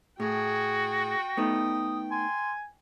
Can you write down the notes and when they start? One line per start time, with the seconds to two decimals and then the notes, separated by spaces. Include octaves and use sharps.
0.20 A2 F#4 G#4 G5
1.37 A3 B3 D#4 D#6
2.11 G#5 C6